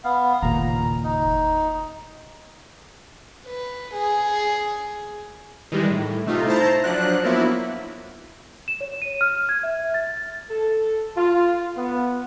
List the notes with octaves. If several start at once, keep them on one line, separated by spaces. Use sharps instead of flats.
B3 F5
F#1 D#2 A#2 A#5
D#4
B4
G#4
D#3 E3 G3 G#3
A2
C3 A3 D#4 F4
E4 C5 A5 A#5
F3 F#3 D4 F#6
F3 F#3 A#3 B3 E4
E7
C#5
D#7
F6
G#6
E5
A6
A4
F4
B3